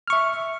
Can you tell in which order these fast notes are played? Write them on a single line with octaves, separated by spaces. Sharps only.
F6 C#6 E5